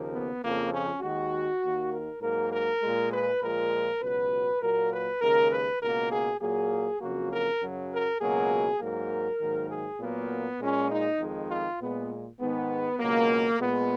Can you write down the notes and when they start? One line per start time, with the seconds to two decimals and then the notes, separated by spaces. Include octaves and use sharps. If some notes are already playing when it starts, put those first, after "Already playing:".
Already playing: D#2 C#3 F3 A#3
0.12 B3
0.42 F2 C#3 F3 A#3
0.72 C#4
1.01 D#2 D#3 G#3 F#4
1.62 D#2 D#3 A#3
1.91 A#4
2.21 G#2 F#3 A#3 A#4
2.51 A#4
2.82 A#2 G#3
3.12 B4
3.41 A#2 F3 G#3 A#4
4.01 C#2 B2 F#3 B4
4.61 A#2 F#3 A#3 A#4
4.91 B4
5.20 D#2 C#3 G#3 A#4
5.52 B4
5.81 C#2 B2 A#3 A#4
6.11 G#4
6.41 A#2 F#3 A#3 G#4
7.00 F2 C#3 F#3 A#3 F#4
7.31 A#4
7.61 F#2 C#3 F#3
7.91 A#4
8.20 C#2 B2 F#3 A#3 G#4
8.80 G#2 F#3 A#3 A#4
9.39 G#2 D#3 F#3 A#3
9.69 G#4
9.99 A#2 F#3 A#3 B3
10.60 A#2 G#3 C#4
10.89 D#4
11.19 F2 D#3 G#3
11.49 F4
11.80 A#2 G#3 B3
12.40 G#2 D#3 G#3 B3
13.00 C#2 B2 F#3 A#3
13.59 A#2 G#3 B3